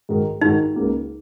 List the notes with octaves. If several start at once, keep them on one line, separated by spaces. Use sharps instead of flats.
G#2 D#3 G#3 F#4 A#4
G#2 D#3 G#3 D#4 F#4 A#4
C#2 C#3 A#3 F#4